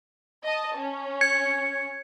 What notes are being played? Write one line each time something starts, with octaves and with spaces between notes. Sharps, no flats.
D#5 A5
C#4
G#6 C#7